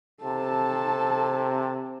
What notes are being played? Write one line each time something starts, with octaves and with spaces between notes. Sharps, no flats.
C3 A4 A5